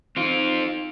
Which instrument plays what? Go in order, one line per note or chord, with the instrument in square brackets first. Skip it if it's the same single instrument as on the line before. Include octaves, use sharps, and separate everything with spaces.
[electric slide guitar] C4 F4 [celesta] D#4 D7